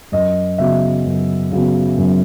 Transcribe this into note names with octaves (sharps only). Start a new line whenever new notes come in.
F#2 D#5
C#3 F#3 B3 E5
F#2
C#3 F#3 B3
F#2